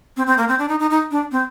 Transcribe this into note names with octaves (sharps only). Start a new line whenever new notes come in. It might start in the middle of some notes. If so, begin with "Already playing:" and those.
C4
C4
A#3
C4
D4
D#4
D#4
D#4
D4
C4